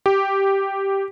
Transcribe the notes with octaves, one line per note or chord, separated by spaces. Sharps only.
G4